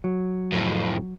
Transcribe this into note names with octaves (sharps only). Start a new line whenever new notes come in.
F#3
F2 A2